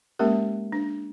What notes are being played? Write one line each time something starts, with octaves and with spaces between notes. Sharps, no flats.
G#3 A#3 C#4 G4 A#4
D4